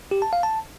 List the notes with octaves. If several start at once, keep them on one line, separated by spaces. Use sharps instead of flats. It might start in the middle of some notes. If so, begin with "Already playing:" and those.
G4
A5
F5
A5